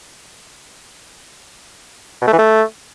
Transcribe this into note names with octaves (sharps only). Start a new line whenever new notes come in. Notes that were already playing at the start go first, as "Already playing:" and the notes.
B2
A3
E3
A3